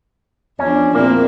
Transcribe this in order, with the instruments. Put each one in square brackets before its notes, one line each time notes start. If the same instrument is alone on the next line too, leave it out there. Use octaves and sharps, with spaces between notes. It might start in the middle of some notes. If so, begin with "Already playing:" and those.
[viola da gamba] E2 F3 D4 [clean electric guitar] C#4
[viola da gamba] E2 C4 E4 [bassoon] A#2 [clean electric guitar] A#3